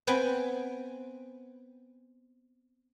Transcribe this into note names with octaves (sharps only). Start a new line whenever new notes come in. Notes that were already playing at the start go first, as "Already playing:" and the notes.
B3 C4 B4 G5 G#5 B5